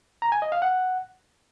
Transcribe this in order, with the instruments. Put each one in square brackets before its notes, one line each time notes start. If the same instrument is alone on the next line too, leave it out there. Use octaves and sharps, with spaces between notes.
[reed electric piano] A#5
G#5
D#5
F5
F#5